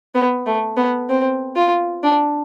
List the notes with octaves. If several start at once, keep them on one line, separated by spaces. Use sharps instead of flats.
B3
A3
B3
C4
F4
D4